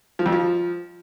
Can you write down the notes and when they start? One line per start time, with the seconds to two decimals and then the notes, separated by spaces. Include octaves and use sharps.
0.19 F3
0.26 F2
0.32 F3